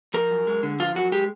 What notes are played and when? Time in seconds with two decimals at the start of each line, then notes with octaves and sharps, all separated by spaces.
0.14 F3 A#4
0.31 F#2
0.47 G#3
0.63 D3
0.80 F3 F4
0.95 F#2 F#4
1.12 G#3 G4